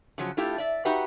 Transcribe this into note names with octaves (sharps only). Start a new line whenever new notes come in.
C#3 F3 F#3
A3 E4 F4 G4
D5 E5
D#4 F#4 G4 B4 E5 F#5